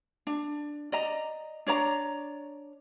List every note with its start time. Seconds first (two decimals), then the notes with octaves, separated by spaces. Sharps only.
0.27 D4
0.92 D5 D#5 A#5
1.67 D4 C#5 D5 A#5